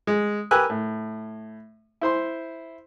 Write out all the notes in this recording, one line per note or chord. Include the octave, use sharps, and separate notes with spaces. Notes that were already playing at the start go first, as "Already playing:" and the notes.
G#3
G4 A#4 B4 G#5 E6 F#6
A2
E4 C5 C6